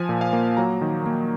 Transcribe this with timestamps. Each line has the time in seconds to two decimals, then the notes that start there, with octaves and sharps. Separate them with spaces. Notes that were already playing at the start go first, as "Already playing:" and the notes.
Already playing: F3 G#5
0.09 A#2
0.21 F5
0.33 A#3
0.57 F#3 A#5
0.81 D#3
1.06 A#3